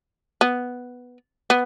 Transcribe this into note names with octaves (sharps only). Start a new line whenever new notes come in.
B3
B3